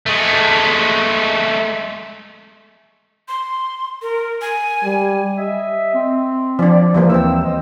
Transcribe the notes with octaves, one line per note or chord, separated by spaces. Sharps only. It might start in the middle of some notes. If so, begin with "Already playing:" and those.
G#3 A3
C6
A#4
G#5
G3
D#5 E5
C4
F3 D4 D5
E3 F3 G3 A#3
D#2 E3 C4 E6
C5 D#5